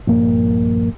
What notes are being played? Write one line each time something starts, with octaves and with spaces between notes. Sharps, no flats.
A#1 G2 A#3